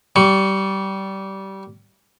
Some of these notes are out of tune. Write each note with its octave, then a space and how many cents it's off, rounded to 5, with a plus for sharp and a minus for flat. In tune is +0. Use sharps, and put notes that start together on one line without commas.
G3 -20 C#6 +10